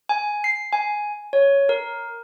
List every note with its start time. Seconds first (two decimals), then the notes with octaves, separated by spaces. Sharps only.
0.09 G#5
0.44 C7
0.72 G#5
1.33 C#5
1.69 A#4